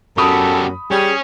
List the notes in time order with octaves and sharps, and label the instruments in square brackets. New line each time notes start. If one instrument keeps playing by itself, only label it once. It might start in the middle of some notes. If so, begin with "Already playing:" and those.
[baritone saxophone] F#2 [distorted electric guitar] G3 B3 [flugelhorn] A4 [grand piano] B5 D#6
[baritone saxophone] G3 [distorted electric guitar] C#4 [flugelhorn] G#4